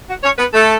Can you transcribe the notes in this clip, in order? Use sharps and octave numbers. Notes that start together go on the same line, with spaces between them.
F#4 F#5
C#4 C#5
B3 B4
A3 A4